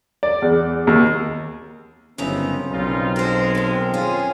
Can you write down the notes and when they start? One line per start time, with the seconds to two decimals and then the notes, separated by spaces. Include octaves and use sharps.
0.23 D5
0.42 E2
0.87 D#2
2.18 G1 F#2 C#3 B3 C4 D#4 E4 A#5
2.71 B1 G3 D#4 F4
3.16 G#3 F#4 A4 A#4 C5
3.55 D#2 D#3
3.94 F2 C#4 F4 G#4